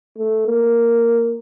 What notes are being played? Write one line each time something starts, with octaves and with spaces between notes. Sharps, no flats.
A3
A#3